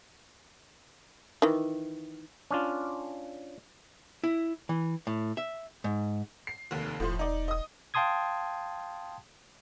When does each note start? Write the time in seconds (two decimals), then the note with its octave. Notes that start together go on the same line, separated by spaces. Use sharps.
1.42 D#3 E3
2.51 C#4 D4 F4
4.24 E4
4.69 E3
5.07 A2
5.37 E5
5.84 G#2
6.47 C7
6.71 F1 D#2
7.00 E1 A2 F3 C6
7.19 D#4 D5
7.48 D#5 D#6
7.94 F5 G5 A5 C6 D#6 G#6